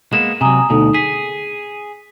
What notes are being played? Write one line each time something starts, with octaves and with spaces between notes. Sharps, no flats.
G#3 A#3 B3 E7
C3 F#3 G#5 A#5 D#6
D2 B2 D#4 A4 D#6
G#4 B6